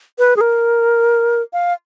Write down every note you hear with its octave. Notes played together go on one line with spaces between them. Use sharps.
B4
G#4
A#4
F5